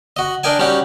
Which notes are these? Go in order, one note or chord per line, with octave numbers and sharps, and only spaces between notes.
F#4 D#5
D4 A#4 D#5 G5 G#5
G3 C#4 D#4 F#4 G4